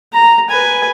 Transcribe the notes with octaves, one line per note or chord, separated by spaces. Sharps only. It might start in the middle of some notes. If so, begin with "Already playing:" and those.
A#5
B4 G#5